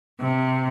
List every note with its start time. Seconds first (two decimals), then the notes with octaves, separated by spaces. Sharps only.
0.20 C3